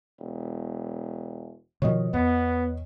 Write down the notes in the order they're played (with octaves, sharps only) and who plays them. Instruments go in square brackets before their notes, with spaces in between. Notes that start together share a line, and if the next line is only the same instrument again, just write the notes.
[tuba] E1
[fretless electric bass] B2 D#3 F3 [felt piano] C#5 D#5
[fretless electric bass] E2 [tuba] B3